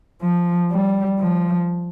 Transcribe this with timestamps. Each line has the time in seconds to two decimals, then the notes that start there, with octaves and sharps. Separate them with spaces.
0.22 F3
0.71 G3
1.19 F3